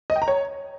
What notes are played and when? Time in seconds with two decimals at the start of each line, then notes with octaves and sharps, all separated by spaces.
0.10 D#5
0.16 G5
0.22 A#5
0.28 C#5